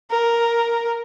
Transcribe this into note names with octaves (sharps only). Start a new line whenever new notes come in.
A#4